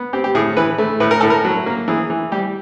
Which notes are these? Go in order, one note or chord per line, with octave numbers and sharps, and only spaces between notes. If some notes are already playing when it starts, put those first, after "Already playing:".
Already playing: B3
C4 G4
G4
A2 G#4
E3 B4
A3
A2 B4
A#4
A2 A4
A#4
F#3
A#3
E3 G#4
E3
G3 G4